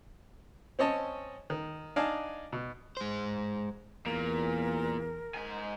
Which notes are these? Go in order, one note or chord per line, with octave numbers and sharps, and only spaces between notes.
C4 C#4 C#5 D#5 A5
D#3
D4 D#4 D5 F5 G#5 A5
B2
G#3 C5
E2 A#2 A#4
G#2 G#5